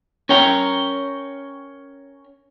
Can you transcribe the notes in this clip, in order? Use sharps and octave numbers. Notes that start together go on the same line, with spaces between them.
C#4 A#4 C#5 G5 A#5